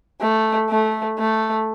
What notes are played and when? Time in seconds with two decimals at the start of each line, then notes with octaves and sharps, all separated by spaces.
0.20 A3
0.70 A3
1.19 A3